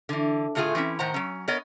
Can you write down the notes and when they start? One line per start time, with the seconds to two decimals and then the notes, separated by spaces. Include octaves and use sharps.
0.09 D3 E3
0.55 A2 D3 A3 F4 G#4 G#5
0.75 E3 C4 C#4 E4
0.99 A2 D#3 C5 F#5 A#5
1.14 F#3 C#4
1.48 B3 A#4 C#5 D#5